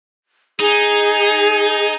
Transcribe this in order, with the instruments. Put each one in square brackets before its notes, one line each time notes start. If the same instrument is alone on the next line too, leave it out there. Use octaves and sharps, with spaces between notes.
[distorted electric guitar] D#4 [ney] G#4